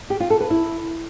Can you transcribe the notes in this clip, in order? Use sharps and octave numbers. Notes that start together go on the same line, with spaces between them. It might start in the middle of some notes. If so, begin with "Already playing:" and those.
G4
F4
A4
B4
E4